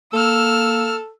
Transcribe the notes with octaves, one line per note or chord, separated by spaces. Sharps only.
A#3 A4 E6 F6